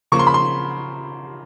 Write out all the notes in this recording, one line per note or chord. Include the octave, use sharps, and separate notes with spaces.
C#3 F3 A#3 C#6
C6
B5
C6